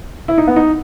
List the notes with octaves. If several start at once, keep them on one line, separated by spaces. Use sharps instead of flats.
E4
D#4
B3
D#4